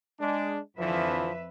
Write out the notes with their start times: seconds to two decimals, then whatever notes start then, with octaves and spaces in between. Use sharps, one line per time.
0.20 G#3 D4
0.79 F2 D3 E3 F3 B4 E5